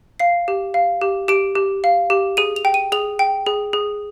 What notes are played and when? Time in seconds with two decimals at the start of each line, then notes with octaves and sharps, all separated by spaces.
0.19 F5 C7
0.48 G4
0.74 F5
1.01 G4
1.28 G4 D7
1.55 G4
1.84 F5
2.10 G4
2.37 G#4 D#7
2.56 F7
2.65 G5
2.74 D#7
2.92 G#4 F7
3.19 G5
3.46 G#4
3.73 G#4